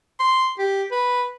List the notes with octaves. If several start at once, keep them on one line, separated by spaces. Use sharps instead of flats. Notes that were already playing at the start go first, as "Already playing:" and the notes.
C6
G4
B4